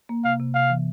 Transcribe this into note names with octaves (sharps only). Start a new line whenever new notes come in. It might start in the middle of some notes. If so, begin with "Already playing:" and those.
A#3
C3 F5
C3
C3 F5
E3